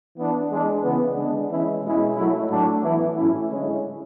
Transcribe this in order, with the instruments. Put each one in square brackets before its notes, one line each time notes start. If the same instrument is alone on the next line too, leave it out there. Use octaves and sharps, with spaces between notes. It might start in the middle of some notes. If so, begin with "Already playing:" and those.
[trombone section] E3 B3 D4
E3 G#3 D4
C#3 E3 B3
D3 G#3 B3 D4
E3 G#3 C#4 E4
B2 G#3 C#4 E4
F#3 A3 E4
A2 F#3 A3 D4
E3 B3 E4
A2 F#3 C#4 E4
D3 G#3 C#4 E4